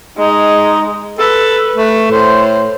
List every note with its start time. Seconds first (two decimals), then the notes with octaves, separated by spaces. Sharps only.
0.17 G#3 D#4
1.19 A4 B4
1.76 A3
2.11 A2 C5